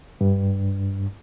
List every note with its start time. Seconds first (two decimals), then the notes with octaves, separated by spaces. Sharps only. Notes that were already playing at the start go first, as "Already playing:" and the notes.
0.21 G2